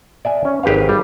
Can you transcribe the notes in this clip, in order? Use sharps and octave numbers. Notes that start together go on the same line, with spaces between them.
D5 E5 G#5
C#4
G#1 G4 B4 F5
G3